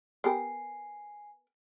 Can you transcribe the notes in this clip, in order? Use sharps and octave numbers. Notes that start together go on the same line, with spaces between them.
B3 G4 A#4 G#5 C7